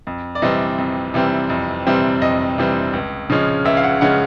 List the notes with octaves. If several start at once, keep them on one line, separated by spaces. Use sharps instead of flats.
F2
D5
C3 E3 G3 C4 D#5
F2
C3 E3 G3 C4
F2
C3 E3 G3 C4
F2 D#5
C3 E3 G3 C4
C#2
C#3 F3 G#3 C#4
C#2 E5
F5
F#5
C#3 F3 G#3 C#4 F#5